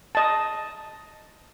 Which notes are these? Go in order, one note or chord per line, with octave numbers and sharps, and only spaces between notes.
D#5 A5